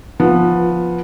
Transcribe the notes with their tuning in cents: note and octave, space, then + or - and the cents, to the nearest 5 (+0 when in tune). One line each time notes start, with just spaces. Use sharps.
F3 +0 B3 -10